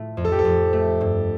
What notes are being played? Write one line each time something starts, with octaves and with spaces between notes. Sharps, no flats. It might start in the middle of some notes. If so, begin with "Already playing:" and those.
Already playing: A2 A3 F4
F2
A4
G4
A4
F2
A3
G2